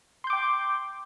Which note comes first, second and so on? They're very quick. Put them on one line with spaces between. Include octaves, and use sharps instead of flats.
C6 G6 D6 G5